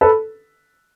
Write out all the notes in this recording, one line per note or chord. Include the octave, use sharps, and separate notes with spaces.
A4 B4